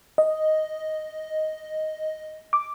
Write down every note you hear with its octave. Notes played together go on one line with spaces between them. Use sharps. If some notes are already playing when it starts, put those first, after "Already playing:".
D#5
D6